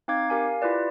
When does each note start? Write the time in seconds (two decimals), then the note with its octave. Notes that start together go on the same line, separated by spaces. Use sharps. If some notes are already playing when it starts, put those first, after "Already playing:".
0.08 C4 D#4 F5 D6 G#6
0.30 G4 A#4 F5 G#5
0.62 E4 F4 G4 B4 D5